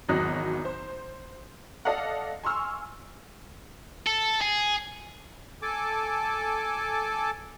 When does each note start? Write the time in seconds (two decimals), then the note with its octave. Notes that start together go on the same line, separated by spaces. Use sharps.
0.09 G#1 E2 F#3 D#4 F#6 A#6
0.65 C5
1.85 A4 D5 D#5 F5 F#5
2.43 G#5 C6 C#6 E6 F6
4.07 A4
4.41 G#4
5.62 A4 G#5 A5 D6